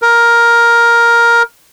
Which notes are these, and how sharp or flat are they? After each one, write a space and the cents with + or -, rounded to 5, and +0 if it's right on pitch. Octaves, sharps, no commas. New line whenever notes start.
A#4 +10